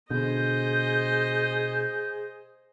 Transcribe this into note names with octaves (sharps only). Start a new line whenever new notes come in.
B2 D3 G#4 C5 D#5 G6